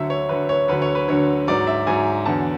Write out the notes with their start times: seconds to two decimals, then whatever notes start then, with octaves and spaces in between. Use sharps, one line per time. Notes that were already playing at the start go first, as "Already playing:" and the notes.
Already playing: D2 D3 F#3 E5
0.10 C#5
0.29 D2 D3 F#3 B4
0.49 C#5
0.68 D2 D3 F#3 B4
0.82 C#5
0.95 B4
1.08 D2 D3 F#3 C#5
1.47 G#2 F#3 D5
1.67 E5
1.87 G#2 F#3 G#5
2.26 E2 D3 F#3 A5